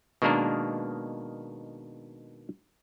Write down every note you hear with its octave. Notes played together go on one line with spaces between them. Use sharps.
B2 D#3 G#3 A#3 D4 A#4